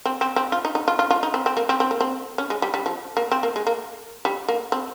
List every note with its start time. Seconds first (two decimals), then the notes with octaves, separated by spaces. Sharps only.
0.05 C4
0.21 C4
0.36 C4
0.52 F4
0.65 D#4
0.75 D#4
0.88 F4
0.99 F4
1.11 F4
1.23 D#4
1.34 C4
1.46 C4
1.57 A#3
1.69 C4
1.80 C4
1.91 A#3
2.01 C4
2.38 C#4
2.50 G#3
2.62 G3
2.74 G3
2.86 F3
3.17 A#3
3.32 C4
3.43 A#3
3.56 G#3
3.67 A#3
4.25 G3
4.48 A#3
4.72 C4